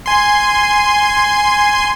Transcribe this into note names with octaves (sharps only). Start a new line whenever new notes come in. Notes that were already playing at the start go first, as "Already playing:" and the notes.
G#5 C6